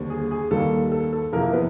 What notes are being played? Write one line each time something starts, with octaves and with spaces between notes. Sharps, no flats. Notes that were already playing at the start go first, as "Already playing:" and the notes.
Already playing: D#2 D3 G3 C4
G#4
G#4
D#2 D#3 G3 A#3 A4
A4
A4
F2 C3 E3 A#3 A#4
B3 B4